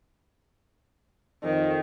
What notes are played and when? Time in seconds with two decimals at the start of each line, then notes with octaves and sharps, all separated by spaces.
1.44 F2 D#3